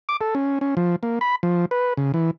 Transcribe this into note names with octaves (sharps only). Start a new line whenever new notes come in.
D6
A4
C#4
C#4
F3
A#3
B5
F3
B4
C#3
E3